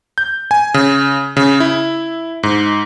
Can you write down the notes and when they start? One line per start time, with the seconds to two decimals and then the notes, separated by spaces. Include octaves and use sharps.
0.18 G6
0.51 G#5
0.74 C#3
1.37 C#3
1.60 E4
2.43 G#2